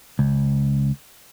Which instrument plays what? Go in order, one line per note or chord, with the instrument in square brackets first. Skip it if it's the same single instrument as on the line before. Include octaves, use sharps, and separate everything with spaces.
[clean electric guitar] C#2